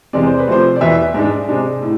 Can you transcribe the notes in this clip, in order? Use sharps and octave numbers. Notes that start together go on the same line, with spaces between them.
E2 C3 G#3 C4 D5
C5
B4
C3 F3 A3 C4 C5
D5
E2 B2 B3 E5
G#2 G#3 D4
C3 G#3 D4
A2